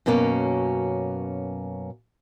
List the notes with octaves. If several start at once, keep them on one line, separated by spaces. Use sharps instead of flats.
F#2 B2 F#3 A#3 B3 C#4